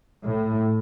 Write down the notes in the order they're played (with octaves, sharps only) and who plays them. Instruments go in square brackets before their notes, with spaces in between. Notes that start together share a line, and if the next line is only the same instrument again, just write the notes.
[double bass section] A2